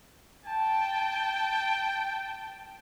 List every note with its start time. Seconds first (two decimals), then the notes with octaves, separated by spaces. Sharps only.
0.45 G5 A5